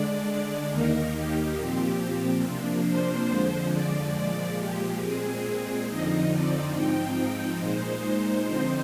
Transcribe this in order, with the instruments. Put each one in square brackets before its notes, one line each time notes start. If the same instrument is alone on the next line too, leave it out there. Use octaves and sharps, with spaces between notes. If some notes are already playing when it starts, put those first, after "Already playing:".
Already playing: [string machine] D3 G#3 D4 D5
D#2 D#3 A#3 D#4 A#4
G4
A#2 F3 C4
C3 F3 A#3 D4
C5
F2 D3 F3 G#3
D5
A#2 F3 G#3 D5
G4
A#2 G#3 C4 G#4
F2 D3 F3 C4 D#4 D#5
D5
G#2 F3 C4 D#4 G5
A#2 G#3 D#4 C5
D3 F3 C4 D#4